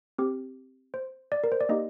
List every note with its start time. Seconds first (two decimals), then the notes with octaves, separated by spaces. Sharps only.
0.18 C4 G4
0.94 C5
1.32 D5
1.44 A#4
1.52 C5
1.61 D5
1.69 A#3 D#4 G4 D#5